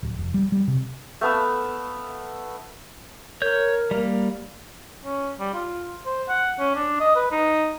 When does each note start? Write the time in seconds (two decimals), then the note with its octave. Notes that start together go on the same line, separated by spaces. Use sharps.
0.03 D1
0.19 F1
0.34 G3
0.52 G3
0.68 C3
1.21 A3 B3 F5 E6
3.42 A#4 C#5 G6
3.91 G3 A#3
5.05 C#4
5.39 G3
5.53 F4
6.06 C5
6.28 F#5
6.59 C#4
6.75 D4
7.00 D#5
7.16 B4
7.32 D#4